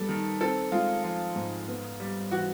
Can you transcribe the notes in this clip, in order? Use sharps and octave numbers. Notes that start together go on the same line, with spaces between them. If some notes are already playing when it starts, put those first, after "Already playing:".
Already playing: G3 B3 A4
D#3
C4 A4
G#3 F4
F3 F4
G#2
B3
G3
E3 F#4